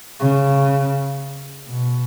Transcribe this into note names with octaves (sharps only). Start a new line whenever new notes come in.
C#3
B2